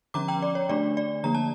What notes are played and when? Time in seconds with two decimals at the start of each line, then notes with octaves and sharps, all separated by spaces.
0.14 D3 F3 C#4 A#5 D6
0.28 G5 A#5
0.42 D5
0.55 C#5
0.69 D3 A3 D4 D5
0.97 D5
1.24 D3 F3 A#3 A#5
1.35 A5